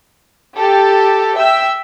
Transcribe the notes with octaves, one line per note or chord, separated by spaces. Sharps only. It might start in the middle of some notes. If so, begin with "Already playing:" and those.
G4 A4
E5 G5 E6